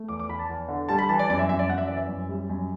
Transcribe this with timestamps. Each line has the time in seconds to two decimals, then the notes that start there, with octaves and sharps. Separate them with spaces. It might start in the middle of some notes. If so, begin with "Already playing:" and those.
Already playing: A3
0.08 E2 D6
0.19 D6
0.29 E2 B5
0.39 A5
0.50 E2
0.68 D3
0.89 G3 A5
0.99 B5
1.09 E3 A5
1.19 D5
1.30 F#2 D5
1.39 E5
1.49 F#2 E5
1.59 D5
1.69 F#2 F#5
1.78 E5
1.87 E3 D5
1.97 E5
2.09 F#2
2.29 G3
2.50 F#2